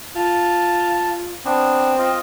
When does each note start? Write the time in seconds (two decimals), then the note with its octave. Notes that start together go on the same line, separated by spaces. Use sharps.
0.16 F4 A5
1.45 B3 C4 D4
1.98 F4 D#5